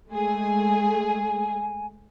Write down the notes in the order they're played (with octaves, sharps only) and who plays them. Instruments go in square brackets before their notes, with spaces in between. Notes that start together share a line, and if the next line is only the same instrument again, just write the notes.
[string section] G#3 A3 G#4 [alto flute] G#5